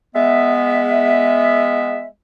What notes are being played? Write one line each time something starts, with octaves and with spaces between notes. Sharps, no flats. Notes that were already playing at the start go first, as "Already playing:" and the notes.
G#3 B3 E5